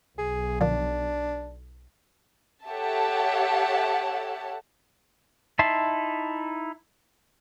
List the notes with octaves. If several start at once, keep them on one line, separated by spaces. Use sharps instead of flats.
B1 G#4
A#2 D3 F3 D4
G4 A4 C#5 E5 F#5 A5
D#4 E4 E5 A5 C6